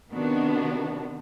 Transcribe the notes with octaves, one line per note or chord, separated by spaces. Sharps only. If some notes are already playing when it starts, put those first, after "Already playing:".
C3 D#3 B3 D4 F#4